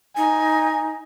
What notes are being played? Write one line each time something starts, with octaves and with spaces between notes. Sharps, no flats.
D#4 G#5